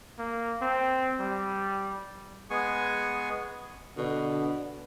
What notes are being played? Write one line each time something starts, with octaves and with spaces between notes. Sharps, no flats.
A#3
C4
G3
G#3 B3 G#4 G#5 C#6
B2 D3